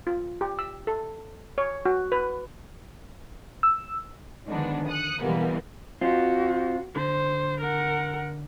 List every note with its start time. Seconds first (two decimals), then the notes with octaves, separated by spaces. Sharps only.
0.07 F4
0.41 G4
0.59 E6
0.87 A4
1.58 C#5
1.85 F#4
2.12 B4
3.63 E6
4.47 D3 D#3 F3 G#3 B3 D4
4.88 D#6 F#6 C#7
5.23 B2 E3 G3 G#3 A#3 B3
6.01 C4 F4 F#4
6.96 D3 C5
7.61 A#4 F#5